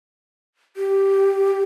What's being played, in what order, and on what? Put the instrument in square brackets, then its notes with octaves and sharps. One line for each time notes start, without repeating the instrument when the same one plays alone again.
[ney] G4